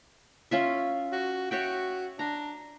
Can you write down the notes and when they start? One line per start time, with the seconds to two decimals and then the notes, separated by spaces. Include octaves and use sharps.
0.51 C#4 F4 E5
1.12 F#4
1.51 F#4 C#5 E5 G5
2.19 D4 A#5